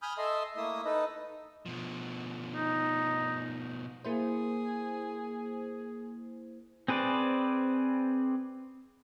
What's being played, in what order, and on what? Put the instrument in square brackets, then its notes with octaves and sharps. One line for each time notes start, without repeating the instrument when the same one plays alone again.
[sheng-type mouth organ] G#5 B5 D#6 F6 G6
A4 D#5 E5 C6
A3 A#3 E4 E5 D#6
D#4 A4 B4 D#5
[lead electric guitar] B2 F3
[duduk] D#4
[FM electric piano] A#3 E4 C5 [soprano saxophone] G#4
[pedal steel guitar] C4 G#4 B4 C5 D5